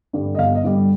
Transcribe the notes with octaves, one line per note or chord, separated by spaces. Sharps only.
G2 D3 G3
D#5
G1 F5
D#5
G2 D3 G3